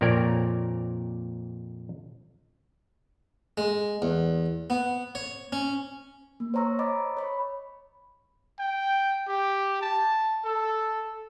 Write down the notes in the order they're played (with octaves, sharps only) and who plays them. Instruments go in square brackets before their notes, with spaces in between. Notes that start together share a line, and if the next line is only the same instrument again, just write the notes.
[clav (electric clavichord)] F2 A#2 C4 A#4 C#5 D5
[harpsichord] G#3
E2
B3
C#5
C#4
[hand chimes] A#3
C5 C#5 A#5 C#6 E6
D#5 B5 D6 A6
C#5 B5 C#6
[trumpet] G5
G4
A5
A4